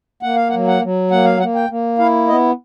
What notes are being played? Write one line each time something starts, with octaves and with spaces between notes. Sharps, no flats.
A#3 F#5
F5
F#5
F#3
F#5
F#3
A#3 F#5
F5
A#3 F#5
G5
A#3
E4 F5
B3 D#5